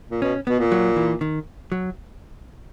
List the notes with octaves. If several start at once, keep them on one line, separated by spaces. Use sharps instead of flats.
A#2
B2 C#4
B2 B3
A#2
F#3
E3
D#3
F#3